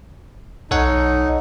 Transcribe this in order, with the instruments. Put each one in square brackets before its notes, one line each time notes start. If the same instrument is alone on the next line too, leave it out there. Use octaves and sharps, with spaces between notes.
[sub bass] B1 [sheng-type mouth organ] D#4 [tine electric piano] A4 C#5 F#5